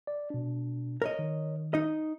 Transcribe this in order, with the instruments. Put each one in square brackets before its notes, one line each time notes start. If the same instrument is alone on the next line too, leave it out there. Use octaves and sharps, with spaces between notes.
[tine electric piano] D5
B2 D4
[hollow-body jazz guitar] A#4 C#5 D#5
[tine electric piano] D#3
[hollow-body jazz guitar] D#4 D#5